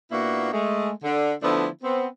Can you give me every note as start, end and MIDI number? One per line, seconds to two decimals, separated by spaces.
0.12 0.51 46
0.12 0.51 58
0.12 0.51 59
0.12 0.51 62
0.12 0.51 64
0.12 0.51 66
0.52 0.90 56
0.52 0.90 57
1.04 1.33 50
1.43 1.67 50
1.43 1.67 53
1.43 1.67 57
1.43 1.67 59
1.43 1.67 62
1.43 1.67 64
1.83 2.06 59
1.83 2.06 60